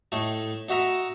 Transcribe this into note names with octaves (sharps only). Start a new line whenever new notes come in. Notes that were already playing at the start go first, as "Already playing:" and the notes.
A2 A3 D#4
D#4 F#4 E5 A#5